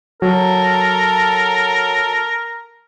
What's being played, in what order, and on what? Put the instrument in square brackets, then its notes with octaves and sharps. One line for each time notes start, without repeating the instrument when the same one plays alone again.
[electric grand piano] F#3 [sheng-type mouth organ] A4 [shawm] A#4